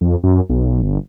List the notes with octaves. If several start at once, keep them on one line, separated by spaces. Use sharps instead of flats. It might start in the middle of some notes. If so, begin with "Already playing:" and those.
F2
F#2
B1
G1